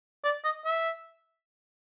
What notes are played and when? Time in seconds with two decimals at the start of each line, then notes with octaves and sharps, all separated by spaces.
0.24 D5
0.44 D#5
0.65 E5